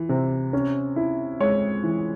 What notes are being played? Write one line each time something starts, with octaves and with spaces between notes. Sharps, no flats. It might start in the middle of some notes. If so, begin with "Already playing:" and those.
Already playing: E3
C3
C#4
E4
G#3 C#5
E3